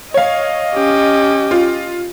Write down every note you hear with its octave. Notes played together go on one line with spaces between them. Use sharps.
C#5 D#5 F5
C#4 G4
F4